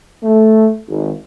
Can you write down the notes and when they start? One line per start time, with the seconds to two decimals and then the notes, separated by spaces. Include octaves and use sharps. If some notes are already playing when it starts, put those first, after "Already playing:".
0.23 A3
0.88 G#1